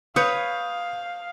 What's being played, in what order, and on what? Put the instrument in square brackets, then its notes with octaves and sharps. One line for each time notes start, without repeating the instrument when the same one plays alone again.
[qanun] B4 C#5 [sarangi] F5 [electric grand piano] D#6 G6